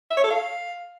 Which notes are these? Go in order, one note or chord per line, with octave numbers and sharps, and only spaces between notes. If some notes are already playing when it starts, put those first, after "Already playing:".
E5
C#5
A4
F5